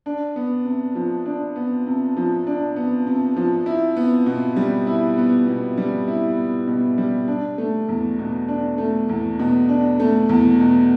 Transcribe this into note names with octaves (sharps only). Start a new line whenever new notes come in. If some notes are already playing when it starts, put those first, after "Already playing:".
D4
B3
C3
F3
D4
B3
C3
F3
D4
B3
C3
F3
E4
B3
B2
G3
E4
B3
B2
G3
E4
B3
B2
G3
D4
A3
E2
B2
D4
A3
E2
B2
D4
A3
E2
B2